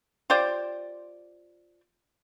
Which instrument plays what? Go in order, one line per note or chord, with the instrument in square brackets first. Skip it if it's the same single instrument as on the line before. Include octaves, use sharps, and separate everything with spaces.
[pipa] F4 G4 C5 D5